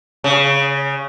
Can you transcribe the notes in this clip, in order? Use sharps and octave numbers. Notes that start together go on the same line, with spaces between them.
C#3